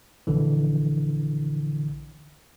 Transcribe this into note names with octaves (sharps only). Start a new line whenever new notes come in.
A#1 D3 E3